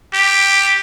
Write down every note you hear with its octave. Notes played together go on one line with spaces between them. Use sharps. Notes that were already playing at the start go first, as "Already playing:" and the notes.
G4